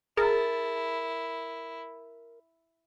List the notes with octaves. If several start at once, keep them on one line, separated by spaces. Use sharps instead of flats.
E4 G#4 A#4 A5